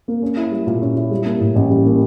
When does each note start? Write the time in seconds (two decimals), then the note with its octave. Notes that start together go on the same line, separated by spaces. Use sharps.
0.08 A#3
0.22 C#4
0.37 E4
0.51 G3
0.67 A#2
0.81 C#4
0.97 E4
1.11 G3
1.25 A#3
1.40 A2
1.56 A1
1.70 G3
1.86 A#3